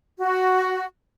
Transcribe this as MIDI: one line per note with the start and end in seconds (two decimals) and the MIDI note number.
0.20 0.84 66